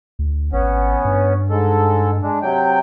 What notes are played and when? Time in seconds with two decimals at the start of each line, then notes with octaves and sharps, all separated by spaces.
0.19 D2
0.53 G#1 B3 C#4
1.05 G2
1.50 G#2 G#3 A4
2.22 G#3 D4
2.42 C3 F#3 G5